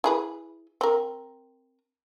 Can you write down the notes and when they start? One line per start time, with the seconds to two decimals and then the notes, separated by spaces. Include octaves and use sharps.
0.04 E4 G#4 B4
0.81 C4 A#4